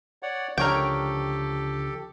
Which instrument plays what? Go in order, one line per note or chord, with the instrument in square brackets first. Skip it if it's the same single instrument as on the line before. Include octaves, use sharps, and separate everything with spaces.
[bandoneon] C#5 D5 F#5
[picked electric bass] C#2 D3 F3 [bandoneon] G4 A4 [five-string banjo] A#4 C#5 G5